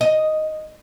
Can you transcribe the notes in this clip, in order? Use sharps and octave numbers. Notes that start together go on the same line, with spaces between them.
D#5